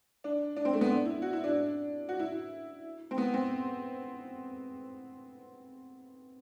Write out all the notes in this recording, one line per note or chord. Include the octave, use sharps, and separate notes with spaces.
D4
D4
C4
A3
B3
D4
E4
F#4
E4
D4
F#4
E4
C4
B3
C4